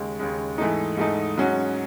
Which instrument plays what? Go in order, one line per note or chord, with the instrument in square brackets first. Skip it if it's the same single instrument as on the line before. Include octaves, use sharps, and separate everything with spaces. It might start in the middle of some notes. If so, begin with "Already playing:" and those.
Already playing: [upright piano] D#2 C#3 G#3
D#2 C#3 G#3
G#2 E3 A3 D#4
G#2 E3 A3 D#4
G#2 F#3 C#4 F#4